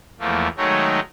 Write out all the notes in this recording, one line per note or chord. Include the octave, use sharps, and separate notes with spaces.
E2 F3 A3 A#3
D#3 F#3 G#3 A3 D#4 C#5